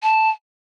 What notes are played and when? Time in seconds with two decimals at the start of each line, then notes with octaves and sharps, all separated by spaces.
0.03 A5